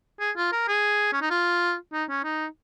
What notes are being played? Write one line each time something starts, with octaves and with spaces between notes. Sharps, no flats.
G#4
F4
A#4
G#4
C#4
D#4
F4
D#4
C#4
D#4